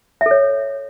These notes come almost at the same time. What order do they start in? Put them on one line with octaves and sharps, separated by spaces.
E5 A4 C#5